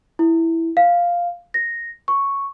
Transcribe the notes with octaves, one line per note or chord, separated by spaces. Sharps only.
E4
F5
A#6
C#6